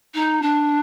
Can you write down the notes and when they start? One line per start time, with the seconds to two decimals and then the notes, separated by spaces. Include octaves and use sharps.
0.14 D#4
0.41 D4